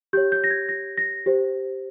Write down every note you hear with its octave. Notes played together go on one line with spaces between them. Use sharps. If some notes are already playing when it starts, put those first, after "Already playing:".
G4 C#5 G6
G6
A#6
G#6
A#6
A#6
G4 C5